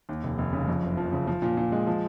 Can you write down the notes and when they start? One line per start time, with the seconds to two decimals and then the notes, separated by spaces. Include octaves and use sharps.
0.09 D#2
0.23 F1
0.38 F1
0.53 C#3
0.68 F2
0.83 F#1
0.97 F3
1.12 C#3
1.27 F3
1.42 A#2
1.57 A#2
1.72 G#3
1.87 F3